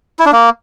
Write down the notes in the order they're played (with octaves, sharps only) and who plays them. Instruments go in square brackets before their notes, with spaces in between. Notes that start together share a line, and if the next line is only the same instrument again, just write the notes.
[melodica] E4
D4
A#3